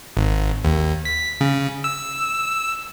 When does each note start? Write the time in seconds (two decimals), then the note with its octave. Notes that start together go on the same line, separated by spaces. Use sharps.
0.17 G#1
0.65 D#2
1.05 B6
1.41 C#3
1.84 E6